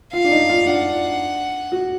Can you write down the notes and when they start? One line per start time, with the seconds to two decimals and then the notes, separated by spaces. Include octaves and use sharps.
0.13 F4 F5
0.24 D4
0.31 D#4
0.49 F4
0.66 D4 F#5
1.72 F#4